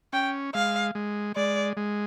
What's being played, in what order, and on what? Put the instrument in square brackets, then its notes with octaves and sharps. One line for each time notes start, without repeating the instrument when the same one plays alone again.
[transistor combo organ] C#4 [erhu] G5
[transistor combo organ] G#3 [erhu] F5
[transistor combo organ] G#3
[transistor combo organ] G#3 [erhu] D5
[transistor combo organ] G#3